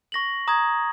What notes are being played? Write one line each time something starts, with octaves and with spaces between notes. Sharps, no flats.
C#6 A#6 F#7
A#5 D#6 G#6